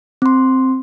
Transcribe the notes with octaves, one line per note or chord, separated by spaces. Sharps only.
C4 C6